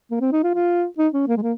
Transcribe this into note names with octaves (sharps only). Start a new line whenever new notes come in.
A#3
C4
D#4
F4
F4
D#4
C#4
A#3
G#3
A#3